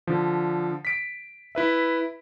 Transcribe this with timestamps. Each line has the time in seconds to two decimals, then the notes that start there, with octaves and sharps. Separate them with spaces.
0.07 D3 F3
0.85 B6 D7
1.55 E4 B4 E5